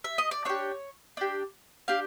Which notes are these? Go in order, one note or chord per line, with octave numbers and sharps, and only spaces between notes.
E5
D#5
D5
D4 G4 C#5
D4 G4
D4 G4 F5